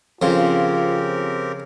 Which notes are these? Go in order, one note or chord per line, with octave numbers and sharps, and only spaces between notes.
F2 C#3 F3 C4 F4 G4 A#4